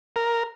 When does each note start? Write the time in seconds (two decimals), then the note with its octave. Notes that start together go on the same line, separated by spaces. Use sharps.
0.16 A#4